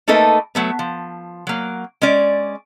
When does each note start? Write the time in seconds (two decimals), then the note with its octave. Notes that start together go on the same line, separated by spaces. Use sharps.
0.08 A3 A#3 D#4 A4 B4 D#5
0.55 F#3 A3 B3
0.79 F3
1.47 F#3 A#3
2.02 G#3 C#4 D5